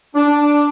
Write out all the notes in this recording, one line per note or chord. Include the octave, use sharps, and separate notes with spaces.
D4